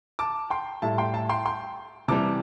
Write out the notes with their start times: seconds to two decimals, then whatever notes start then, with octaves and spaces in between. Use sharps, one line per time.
0.19 A5 D6
0.50 G5 C6
0.82 A2 G3 E5 A5
0.98 G5 C6
1.14 E5 A5
1.29 G5 C6
1.45 G5 C6
2.08 C3 E3 G3 A5 D6